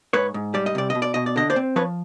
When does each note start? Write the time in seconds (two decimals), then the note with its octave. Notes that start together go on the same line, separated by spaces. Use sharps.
0.13 G#2 B4 C#5
0.34 G#2
0.54 G3 D5
0.66 D#5
0.75 C3 D5
0.90 B2 D#5
1.02 D5
1.14 B2 D#5
1.26 D5
1.36 D3 D#5
1.50 C5 D5
1.56 C4
1.76 F3 B4 C#5